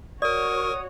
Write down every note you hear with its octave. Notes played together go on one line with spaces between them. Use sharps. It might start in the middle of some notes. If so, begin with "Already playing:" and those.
F#4 A#4 C#5 D5 C#6 D#6